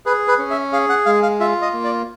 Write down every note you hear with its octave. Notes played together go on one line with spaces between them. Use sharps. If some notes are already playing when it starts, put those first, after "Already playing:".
G#4 B4
B4
C#4
E5
G#4 F5
F#5
G#3 F5
F5
F4 E5
D#5
A#3
D5